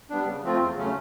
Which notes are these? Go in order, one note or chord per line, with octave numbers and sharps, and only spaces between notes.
G3 B3 D4
C#3
F3 A3 C4 F4
E2
C#3 F#3 A3 C#4